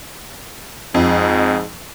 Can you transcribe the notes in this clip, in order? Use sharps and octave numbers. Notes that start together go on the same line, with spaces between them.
F2 G#2